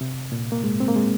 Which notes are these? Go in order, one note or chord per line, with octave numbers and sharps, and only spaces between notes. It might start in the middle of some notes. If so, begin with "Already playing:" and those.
C3
A#2
A#3
G#2 G#3
C4
A#3
G#3